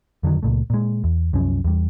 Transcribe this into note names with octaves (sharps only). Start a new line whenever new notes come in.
F2 D3 D#3 F#3
C#2 A#2 A3
A#2 G#3
E2
C2 F#2 F3 C#4
E2 G3